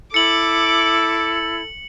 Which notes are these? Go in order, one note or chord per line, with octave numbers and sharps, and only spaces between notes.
E4 A4 D6 C#7 F#7